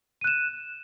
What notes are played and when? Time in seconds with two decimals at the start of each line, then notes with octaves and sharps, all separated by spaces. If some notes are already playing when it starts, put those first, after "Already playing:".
0.21 D#7
0.24 F#6
0.27 E7